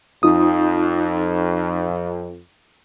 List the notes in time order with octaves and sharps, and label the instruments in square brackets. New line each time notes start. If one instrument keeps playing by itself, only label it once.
[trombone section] F2 [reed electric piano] D#4 F4 D#6